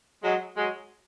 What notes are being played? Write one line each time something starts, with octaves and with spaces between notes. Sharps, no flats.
F#3 G#3
F#3 G#3